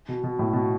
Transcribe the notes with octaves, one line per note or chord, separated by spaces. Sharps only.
B2
B2
A2
B2